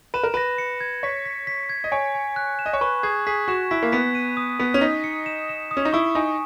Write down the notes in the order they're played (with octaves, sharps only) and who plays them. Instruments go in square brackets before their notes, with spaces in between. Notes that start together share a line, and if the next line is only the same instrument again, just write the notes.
[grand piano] B4 [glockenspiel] E7
[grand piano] A#4
[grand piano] B4 [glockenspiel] A#6
[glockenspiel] C#7
G#6
[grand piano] C#5 [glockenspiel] B6
[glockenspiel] B6
B6
G#6
[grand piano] D#5
[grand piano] C#5 [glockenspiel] G#5
[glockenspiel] G#5
F#6
E7
[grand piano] D#5
C#5
[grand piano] B4 [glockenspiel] C#6
[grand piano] G#4 [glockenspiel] G#6
[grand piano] G#4 [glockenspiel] B6
[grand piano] F#4 [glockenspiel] E7
[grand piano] E4 [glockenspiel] B6
[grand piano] A#3
[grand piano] B3 [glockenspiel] B6
[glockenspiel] D#7
D#6
[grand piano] B3 [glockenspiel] B6
[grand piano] C#4
[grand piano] D#4 [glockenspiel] B6
[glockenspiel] C#7
E7
E7
D#6
[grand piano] C#4
D#4
[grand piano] E4 [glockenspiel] C#6
[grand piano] D#4 [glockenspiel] G#5